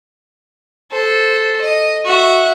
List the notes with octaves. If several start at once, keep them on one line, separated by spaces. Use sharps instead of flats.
A4 C5
D#5
F#4 E5